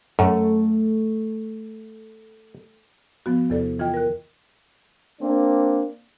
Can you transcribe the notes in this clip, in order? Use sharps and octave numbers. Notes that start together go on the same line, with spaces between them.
F#2 A3
F3 B3 F#4
E2 C3 A4 D5
E3 F4 D#5 G5 G#6
A#4 F#6
A#3 C4 D4